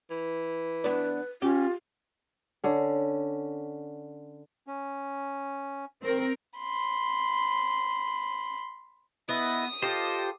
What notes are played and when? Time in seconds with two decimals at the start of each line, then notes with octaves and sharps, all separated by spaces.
0.10 E3
0.84 B3 D4 B4
1.42 C#4 F4 G4
2.64 D3 C#4
4.67 C#4
6.02 D#3 C4 A#4
6.59 B5 C6
9.29 B3 E4 D#5 D#6
9.82 F4 G4 A4 C5 D#5